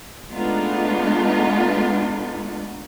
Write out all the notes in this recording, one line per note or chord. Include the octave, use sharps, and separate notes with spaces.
G#3 A3 B3 D4 D#4 F4